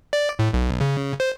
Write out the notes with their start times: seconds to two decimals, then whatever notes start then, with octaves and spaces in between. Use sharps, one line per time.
0.13 D5
0.39 A2
0.53 B1
0.81 C#3
1.20 C5